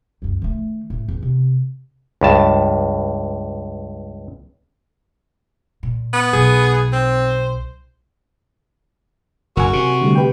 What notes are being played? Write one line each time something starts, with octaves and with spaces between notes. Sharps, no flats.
C#2 F#2
D#3 A3
A2 A3
E2
C3
C#2 G2 A5
A#2
B3
B1 G#4
C4 C5
F#1 F#4 A#4 F#5 G#5
C3
D3 G3 A3
G4 B4 G5